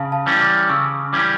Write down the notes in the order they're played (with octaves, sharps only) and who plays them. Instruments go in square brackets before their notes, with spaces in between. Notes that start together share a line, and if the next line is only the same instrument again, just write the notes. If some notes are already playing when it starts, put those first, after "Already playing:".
Already playing: [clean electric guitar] C#3 [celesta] F5 A5
[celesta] F5 A5
[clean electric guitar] E3 G3 C#4
[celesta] D6 F6
[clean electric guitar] C#3 [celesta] C#6 E6
[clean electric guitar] E3 G3 C#4